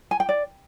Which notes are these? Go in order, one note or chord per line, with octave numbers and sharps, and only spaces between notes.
G#5
G5
D5